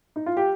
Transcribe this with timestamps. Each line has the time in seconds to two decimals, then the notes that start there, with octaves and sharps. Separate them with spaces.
0.16 D#4
0.26 F4
0.37 G4